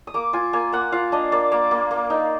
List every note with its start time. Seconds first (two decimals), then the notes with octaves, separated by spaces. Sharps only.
0.07 D#6
0.14 A#3 D6
0.33 F4 G#5
0.53 A#3 G#5
0.72 A#3 F#5
0.92 F4 F5
1.12 D4 D#5
1.32 A#3 D5
1.52 A#3
1.71 A#3
1.91 A#3
2.10 D#4